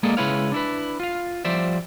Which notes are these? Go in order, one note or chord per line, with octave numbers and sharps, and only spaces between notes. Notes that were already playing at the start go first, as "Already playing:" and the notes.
G#3 A#3 G#4 A4 D5 D#5
C#3 G#3 E4 B4 C#5 F5
D4 E4 B4
F4 F5
F3 G3 C5 D5 E5